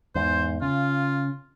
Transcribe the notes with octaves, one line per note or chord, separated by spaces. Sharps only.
E2 G#2 C5
C#3 F4